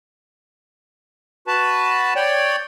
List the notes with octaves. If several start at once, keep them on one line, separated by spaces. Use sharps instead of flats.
F#4 B4 A5
C#5 D5 G5